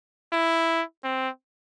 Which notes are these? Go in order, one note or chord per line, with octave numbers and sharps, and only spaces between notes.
E4
C4